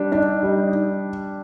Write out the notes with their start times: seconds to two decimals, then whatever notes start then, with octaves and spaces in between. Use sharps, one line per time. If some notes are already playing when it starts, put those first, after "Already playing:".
Already playing: G3 D4
0.12 D4 D#4
0.43 G3